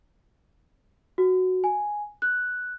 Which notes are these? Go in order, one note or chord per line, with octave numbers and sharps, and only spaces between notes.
F#4
G#5
F#6